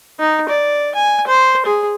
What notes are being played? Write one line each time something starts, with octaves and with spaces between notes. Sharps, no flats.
D#4
D5
G#5
C5
G#4